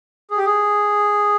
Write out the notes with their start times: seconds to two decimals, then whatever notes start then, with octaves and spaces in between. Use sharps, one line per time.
0.31 G#4
0.38 G4
0.46 G#4